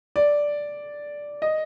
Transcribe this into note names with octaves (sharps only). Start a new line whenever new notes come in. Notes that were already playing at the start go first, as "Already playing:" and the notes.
D5
D#5